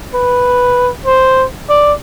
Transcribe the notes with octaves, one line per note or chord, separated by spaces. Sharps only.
B4
C5
D5